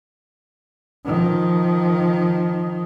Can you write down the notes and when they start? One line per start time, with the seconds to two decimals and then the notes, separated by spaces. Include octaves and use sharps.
1.06 D#3 F3